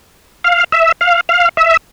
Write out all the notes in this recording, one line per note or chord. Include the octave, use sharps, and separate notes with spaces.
F5
E5
F5
F5
E5